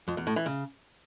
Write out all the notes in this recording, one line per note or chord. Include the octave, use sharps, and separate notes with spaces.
F2
E2
A2
E3
C#3